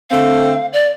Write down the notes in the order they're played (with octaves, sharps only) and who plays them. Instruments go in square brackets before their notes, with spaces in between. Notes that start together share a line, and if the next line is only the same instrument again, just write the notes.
[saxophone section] D3 A3 C4 [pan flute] F5
[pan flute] D5